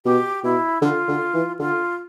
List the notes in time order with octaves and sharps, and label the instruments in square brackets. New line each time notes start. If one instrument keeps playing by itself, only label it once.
[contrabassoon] B2 [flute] G4
[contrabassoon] B2 [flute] E4
[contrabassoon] D3 [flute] F4
[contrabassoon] D3
E3
[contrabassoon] D3 [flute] F4